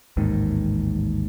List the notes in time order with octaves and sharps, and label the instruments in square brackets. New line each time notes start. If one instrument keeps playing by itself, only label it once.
[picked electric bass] A1 D#2 G#2 D#3